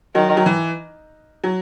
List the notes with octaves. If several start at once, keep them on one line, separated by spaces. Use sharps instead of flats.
D#3 F#3
F#3
E3
F#3